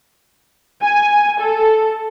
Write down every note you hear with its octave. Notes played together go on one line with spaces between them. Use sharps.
G#5
A4